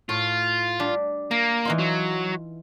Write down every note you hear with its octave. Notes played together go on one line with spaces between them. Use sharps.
A2 F4
G3 D4
A#3 A#5
E3 D#4 F4
F#3